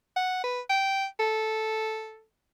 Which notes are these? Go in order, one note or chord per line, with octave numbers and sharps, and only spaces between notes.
F#5
B4
G5
A4